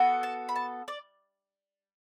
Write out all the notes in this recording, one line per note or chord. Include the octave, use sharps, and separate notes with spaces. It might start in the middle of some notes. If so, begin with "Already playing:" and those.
Already playing: B3 F#4 A4
A5
B5
A5
D5